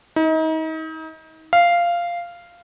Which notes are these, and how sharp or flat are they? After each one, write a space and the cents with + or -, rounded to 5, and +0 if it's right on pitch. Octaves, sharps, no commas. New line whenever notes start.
D#4 +35
F5 -10